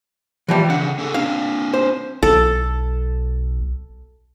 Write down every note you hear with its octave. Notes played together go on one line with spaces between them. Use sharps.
E3 F3 G3
C#3 D4 F#5
C#4 G#4 A4
C4 D4 F5
C5
B1 A4